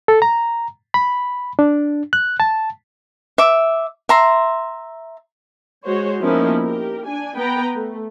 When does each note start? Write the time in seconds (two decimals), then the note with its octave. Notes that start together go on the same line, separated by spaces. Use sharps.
0.08 A4
0.22 A#5
0.94 B5
1.59 D4
2.13 F#6
2.40 A5
3.38 E5 D6
4.09 E5 A#5 C6
5.85 G#3 F#4 C5 C#5
6.22 F3 A#3 B3 C#4 D#4 E4
6.63 G4 A#4
7.07 D4 G#5
7.35 B3 B4 G5 A#5
7.75 A3